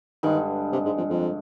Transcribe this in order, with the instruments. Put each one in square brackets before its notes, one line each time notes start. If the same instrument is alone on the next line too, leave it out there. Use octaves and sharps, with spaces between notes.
[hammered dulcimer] G2 D3 G#3 [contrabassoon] D#3
[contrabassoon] C3
G#2
F2
F2